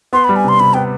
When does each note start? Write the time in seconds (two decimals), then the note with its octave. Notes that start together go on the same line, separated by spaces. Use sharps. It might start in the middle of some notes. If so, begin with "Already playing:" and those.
0.13 B3 C6
0.24 G3 B5
0.36 G#5
0.44 C3 C6
0.60 C3 B5
0.74 B3 G5